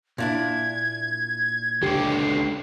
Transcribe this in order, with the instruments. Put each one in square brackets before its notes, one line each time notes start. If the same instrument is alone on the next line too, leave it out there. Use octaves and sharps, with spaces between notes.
[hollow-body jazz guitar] A#2 D4 E4 [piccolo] G#6
[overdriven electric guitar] C#2 D3 [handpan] G4 [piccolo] C7